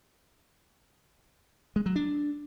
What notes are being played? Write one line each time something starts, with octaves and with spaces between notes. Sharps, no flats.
G#3
F#3
D4